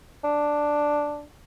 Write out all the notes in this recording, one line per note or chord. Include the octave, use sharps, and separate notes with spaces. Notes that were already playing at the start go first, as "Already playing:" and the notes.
D4